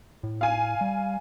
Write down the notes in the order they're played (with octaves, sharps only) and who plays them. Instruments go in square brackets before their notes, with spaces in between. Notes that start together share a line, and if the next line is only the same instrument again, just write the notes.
[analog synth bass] A2
[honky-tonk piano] F5 G#5
[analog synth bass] G3